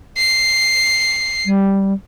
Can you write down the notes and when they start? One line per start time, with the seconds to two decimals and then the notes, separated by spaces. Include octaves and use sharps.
0.17 C7
1.46 G3